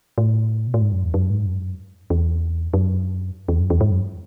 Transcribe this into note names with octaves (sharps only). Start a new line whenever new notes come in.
A2
B2
A2
G#2
F#2
E2
F#2
G#2
F#2
E2
F#2
E2
F#2
E2
G#2
F#2